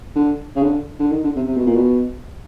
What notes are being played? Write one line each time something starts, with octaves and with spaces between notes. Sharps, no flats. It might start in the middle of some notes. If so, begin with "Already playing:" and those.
D3
C#3
D3
D3
D#3
D3
C3
C3
B2
A#2
B2